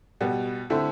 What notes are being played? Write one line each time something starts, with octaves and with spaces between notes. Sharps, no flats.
B2 G3 B3
D3 A3 C4 E4